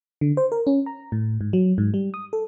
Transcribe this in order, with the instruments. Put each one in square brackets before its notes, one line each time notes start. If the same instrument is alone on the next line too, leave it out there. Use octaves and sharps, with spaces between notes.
[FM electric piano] D3
C5
A#4
C#4
A#5
A2
G#2
F#3
G#2
G3
D#6
A4